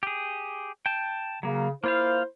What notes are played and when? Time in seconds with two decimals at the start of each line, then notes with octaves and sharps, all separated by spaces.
0.03 G4 G#4
0.86 G5 A5
1.43 C#3 F#3 A#3
1.84 A#3 E4 F4 C5 F5